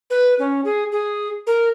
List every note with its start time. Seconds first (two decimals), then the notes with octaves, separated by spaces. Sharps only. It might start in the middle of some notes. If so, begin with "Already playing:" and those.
0.10 B4
0.39 C#4
0.65 G#4
0.92 G#4
1.47 A#4